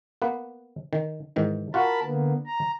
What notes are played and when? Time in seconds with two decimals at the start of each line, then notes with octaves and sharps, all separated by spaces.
0.22 A#3 B3 B4
0.93 D#3
1.36 G#2 D#3 E3
1.74 F4 F#4 A#4 F#5 A5 B5
2.03 D3 A#3 B3
2.46 A#5